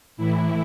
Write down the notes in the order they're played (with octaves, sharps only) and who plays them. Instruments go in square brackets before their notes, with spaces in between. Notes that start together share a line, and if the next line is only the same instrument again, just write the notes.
[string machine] A2 E3 E4